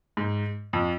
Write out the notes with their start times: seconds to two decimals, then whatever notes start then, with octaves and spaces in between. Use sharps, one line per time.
0.17 G#2
0.73 F2